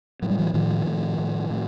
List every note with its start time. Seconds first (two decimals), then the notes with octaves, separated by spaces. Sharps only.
0.22 A2 F#3
0.30 G3
0.39 E3 F#3
0.54 A2 D#3 F3
0.86 A2
1.19 A2
1.50 A2